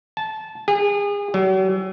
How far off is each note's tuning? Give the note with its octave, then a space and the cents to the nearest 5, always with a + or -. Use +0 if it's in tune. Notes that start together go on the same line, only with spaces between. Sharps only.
A5 -15
G#4 -35
F#3 +40